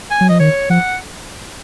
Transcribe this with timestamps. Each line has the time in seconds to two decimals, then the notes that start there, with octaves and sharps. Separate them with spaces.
0.11 G#5
0.21 F#3
0.29 F3 D#5
0.40 D#3 C#5
0.70 F3 F#5